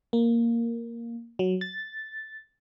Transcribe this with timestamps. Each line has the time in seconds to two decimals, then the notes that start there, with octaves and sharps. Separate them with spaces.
0.13 A#3
1.39 F#3
1.61 A6